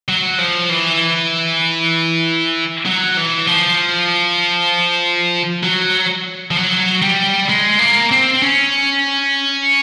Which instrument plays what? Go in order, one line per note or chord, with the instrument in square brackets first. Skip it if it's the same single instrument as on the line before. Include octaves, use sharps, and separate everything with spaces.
[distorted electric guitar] F#3
F3
E3
F#3
E3
F3
F#3
F3
F#3
G3
G#3
A#3
C4
C#4